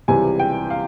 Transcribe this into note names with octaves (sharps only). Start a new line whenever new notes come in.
C#2 C3 E3 G3 G#5
G5
F5